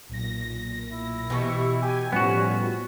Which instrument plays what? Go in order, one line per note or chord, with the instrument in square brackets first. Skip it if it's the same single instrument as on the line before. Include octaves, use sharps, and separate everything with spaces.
[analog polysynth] B1 A#2 A#6
[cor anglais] E4
[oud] B2 E3 [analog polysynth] G4 C#6
[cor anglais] G4 [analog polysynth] G#5
[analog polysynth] A2 F3 G3 [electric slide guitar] B3 F#4 [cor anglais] C#4